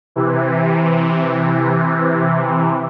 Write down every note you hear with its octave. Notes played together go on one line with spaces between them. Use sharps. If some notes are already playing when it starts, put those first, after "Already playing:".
C3 E3